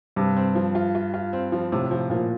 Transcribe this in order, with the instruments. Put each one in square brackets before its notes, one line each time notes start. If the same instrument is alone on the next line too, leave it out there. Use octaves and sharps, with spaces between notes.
[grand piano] G2 [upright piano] C3
[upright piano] C4
F3
F4
F4
F4
C4
F3
[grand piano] A2 [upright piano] C3
[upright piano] F3
[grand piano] A#2 [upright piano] F3